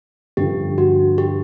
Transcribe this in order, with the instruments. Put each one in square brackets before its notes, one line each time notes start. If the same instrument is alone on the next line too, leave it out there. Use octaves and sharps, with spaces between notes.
[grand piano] G2 D3 F3 [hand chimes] G4
[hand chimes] F#4
G4